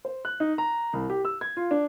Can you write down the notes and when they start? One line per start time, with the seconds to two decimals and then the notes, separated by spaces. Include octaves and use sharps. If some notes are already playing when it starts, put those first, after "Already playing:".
0.05 C5
0.25 F#6
0.40 D#4
0.58 A#5
0.93 C2
1.10 G4
1.25 E6
1.41 G#6
1.57 F4
1.71 D4